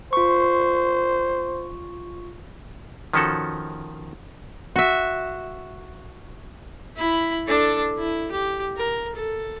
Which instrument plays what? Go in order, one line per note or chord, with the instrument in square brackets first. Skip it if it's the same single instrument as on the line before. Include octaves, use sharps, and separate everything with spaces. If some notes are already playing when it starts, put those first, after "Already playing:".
[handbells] F4 C#6 [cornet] C5
[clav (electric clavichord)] D#3 F3 C#4 F#4 A4
[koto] F#4 E5
[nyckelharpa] E4 B5
D4 A4
E4
G4
A#4
A4